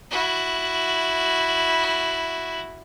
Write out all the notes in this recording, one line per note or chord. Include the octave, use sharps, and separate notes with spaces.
E4 F#4